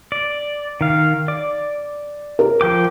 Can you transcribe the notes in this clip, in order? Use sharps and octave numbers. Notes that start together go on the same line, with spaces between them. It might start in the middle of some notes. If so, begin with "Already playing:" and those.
D5
D#3 F5
D5 D6
A#4
F3 G5 D6